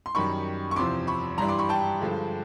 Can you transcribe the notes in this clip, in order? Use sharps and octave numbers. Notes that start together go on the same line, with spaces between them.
C6
F#2 D#3 G3 B5 C#6
C#6
E2 C3 F3 C6 D6
B5 C#6
G2 E3 G3 A#5 C6
C6 D6
B5 C#6
G5 A5
G2 D3 F3 G#3